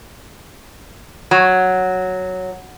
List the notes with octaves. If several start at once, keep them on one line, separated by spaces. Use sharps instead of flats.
F#3